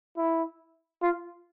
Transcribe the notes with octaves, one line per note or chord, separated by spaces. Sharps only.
E4
F4